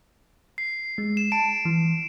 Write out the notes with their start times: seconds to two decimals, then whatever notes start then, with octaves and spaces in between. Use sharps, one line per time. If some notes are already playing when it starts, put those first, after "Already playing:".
0.58 C7
0.98 G#3
1.17 E7
1.32 A5 D7
1.65 E3